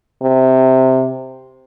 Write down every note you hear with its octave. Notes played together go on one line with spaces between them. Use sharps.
C3